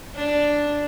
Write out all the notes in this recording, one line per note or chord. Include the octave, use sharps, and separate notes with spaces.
D4